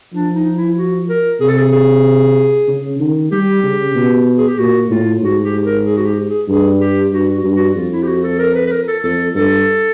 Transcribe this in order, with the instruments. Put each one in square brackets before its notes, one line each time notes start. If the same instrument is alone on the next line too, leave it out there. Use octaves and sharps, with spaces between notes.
[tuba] F3 [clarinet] D4
[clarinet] D#4
E4
F#4
A#4
[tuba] C3 [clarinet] G#4
[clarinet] A4
G#4
G#4
[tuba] C#3
D#3
[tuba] G3 [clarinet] G4
[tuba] C#3
B2
[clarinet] G#4
G4
[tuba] A#2 [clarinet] F#4
[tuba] A2 [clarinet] F4
[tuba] G#2 [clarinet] F#4
[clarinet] G4
A#4
G#4
F#4
G4
G#4
[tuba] G2 [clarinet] G#4
[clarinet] G4
[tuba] G2 [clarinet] F#4
[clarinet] F#4
[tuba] G2
[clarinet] F#4
[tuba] F2 [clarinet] F4
[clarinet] E4
G4
F#4
A4
A#4
B4
B4
A#4
A4
[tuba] F2 [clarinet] A4
[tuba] G2 [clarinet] A4